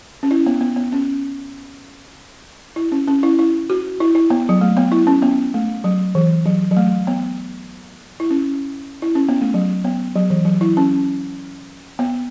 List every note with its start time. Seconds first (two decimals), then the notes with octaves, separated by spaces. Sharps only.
0.23 C#4
0.31 E4
0.46 B3
0.61 B3
0.76 B3
0.92 C#4
2.76 E4
2.92 C#4
3.08 C#4
3.23 E4
3.39 E4
3.70 F#4
4.00 E4
4.15 E4
4.30 B3
4.49 F#3
4.61 A3
4.77 B3
4.92 E4
5.07 C#4
5.22 B3
5.54 A3
5.84 F#3
6.15 E3
6.46 F#3
6.71 F#3
6.77 A3
7.07 B3
8.20 E4
8.30 C#4
9.02 E4
9.15 C#4
9.29 B3
9.41 A3
9.54 F#3
9.84 B3
10.16 F#3
10.30 E3
10.45 F#3
10.61 E4
10.77 C#4
11.99 B3